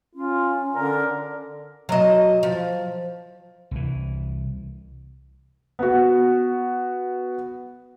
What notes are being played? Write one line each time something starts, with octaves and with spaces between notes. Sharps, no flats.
C#4 F4
D3 A#4 D5
F#3 D#5
F3
C2 E3
B3 F#4